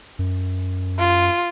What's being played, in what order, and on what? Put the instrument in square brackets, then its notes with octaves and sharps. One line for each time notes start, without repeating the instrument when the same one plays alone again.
[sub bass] F#2
[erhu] F4